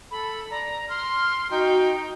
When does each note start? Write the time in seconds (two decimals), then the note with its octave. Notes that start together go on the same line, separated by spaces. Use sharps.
0.11 A4 B5
0.50 D5 A#5
0.89 C6 F6
1.51 D#4 F#4 G5